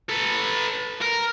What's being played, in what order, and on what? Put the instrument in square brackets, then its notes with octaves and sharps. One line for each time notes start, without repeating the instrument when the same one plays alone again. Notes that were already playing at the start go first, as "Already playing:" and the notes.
[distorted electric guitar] A4 B4
A#4